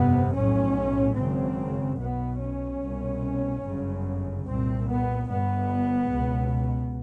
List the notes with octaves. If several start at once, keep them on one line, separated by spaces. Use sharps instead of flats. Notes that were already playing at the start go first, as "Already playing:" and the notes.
Already playing: G1 F2 C3 B3
B1 A2 C#4
G#1 F#2 C#3 C4
B1 B2 B3
C#4
C2 B2
G1 F#2 C#3
C2 A#2 C4
B3
G1 G2 B3
C#2 B2